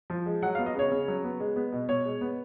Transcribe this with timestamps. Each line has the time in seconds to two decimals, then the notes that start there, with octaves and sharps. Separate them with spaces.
0.10 F3
0.26 G#3
0.43 F#3 F#5
0.55 F5
0.58 B3
0.66 D#5
0.75 C#3 C#5
0.92 C#3
1.08 F#3
1.24 B3
1.40 G#3
1.56 B3
1.72 B2
1.89 B2 C#5
2.05 G#3
2.21 B3